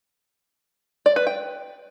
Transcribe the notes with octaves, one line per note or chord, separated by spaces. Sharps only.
D5
B4
G5